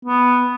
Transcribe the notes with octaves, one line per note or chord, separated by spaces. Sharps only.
B3